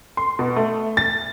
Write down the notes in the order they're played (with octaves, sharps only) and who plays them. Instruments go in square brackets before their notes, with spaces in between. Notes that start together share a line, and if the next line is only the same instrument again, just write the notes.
[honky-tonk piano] C6
B2
A3
A6